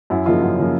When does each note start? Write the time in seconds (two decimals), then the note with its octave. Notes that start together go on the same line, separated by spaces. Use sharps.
0.10 F#2 E4
0.26 C#3 F3 A#3 D#4 F4
0.42 F#2
0.58 C#3 F3 A#3